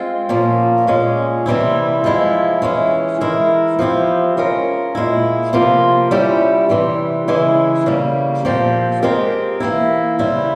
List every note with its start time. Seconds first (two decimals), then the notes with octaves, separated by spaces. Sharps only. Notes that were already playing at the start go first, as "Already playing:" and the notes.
Already playing: G#3 C4 F4
0.29 A#2 F3 A#3 C#4
0.87 A#2 G#3 C#4
1.46 C3 E3 G3 C4 E4
2.04 F3 G#3 E4
2.62 E3 G#3 C#4
3.21 E3 G#3 E4 A#4
3.79 F3 C4 E4 G4
4.37 G#3 C#4 F4 A#4
4.95 A#2 G#3 E4
5.53 C3 F3 A#3 F4
6.11 G3 C#4 E4 G4
6.69 C3 E3 G3 C4
7.28 C#3 E3 G#3 E4
7.86 C#3 G3 A#3
8.45 A#2 F3 C4 G4
9.02 G#3 C4 G4 A#4
9.60 E3 A#3 E4
10.19 C#3 G3 C4 E4